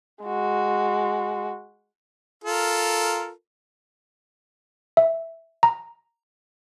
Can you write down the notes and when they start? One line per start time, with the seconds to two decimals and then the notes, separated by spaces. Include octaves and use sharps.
0.24 G#3 F#4
2.44 F4 A4 A#4
4.97 E5
5.63 A#5